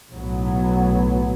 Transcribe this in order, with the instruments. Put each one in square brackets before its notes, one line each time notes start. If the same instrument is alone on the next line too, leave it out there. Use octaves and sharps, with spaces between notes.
[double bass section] B1 A2 F#3 B3